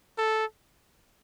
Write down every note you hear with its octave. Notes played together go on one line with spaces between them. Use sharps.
A4